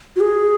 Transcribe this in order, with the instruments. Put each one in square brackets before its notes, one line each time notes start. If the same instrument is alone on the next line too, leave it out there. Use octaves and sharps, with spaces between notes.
[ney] F#4
G#4